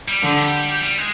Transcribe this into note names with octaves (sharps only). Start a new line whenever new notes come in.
G3
D3 F3
G3
G3
G#3